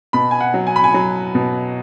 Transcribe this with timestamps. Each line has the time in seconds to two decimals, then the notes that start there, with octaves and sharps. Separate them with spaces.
0.13 B2 B5
0.31 G#5
0.41 F#5
0.54 F#3
0.67 G#5
0.76 B5
0.84 G#5
0.94 F#3
1.35 B2